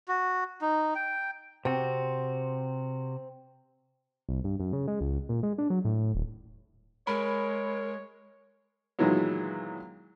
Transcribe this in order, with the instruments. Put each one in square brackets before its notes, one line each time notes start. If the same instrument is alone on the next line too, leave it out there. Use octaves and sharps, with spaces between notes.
[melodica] F#4
D#4
G5
[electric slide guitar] C3 F#4 [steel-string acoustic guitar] C4
[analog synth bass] C2
G2
F#2
C#3
G#3
C#2
A#2
G#3
D4
F#3
A2
D#1
[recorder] G#3 [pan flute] A#4 [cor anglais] C#5 [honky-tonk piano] B5
[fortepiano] A#2 D#3 E3 F#3 G#3 B3